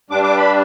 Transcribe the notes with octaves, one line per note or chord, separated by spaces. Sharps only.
G2 G3 D4 D6
D6
B5